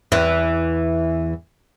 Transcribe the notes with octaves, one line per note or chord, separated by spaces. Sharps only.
E2 E3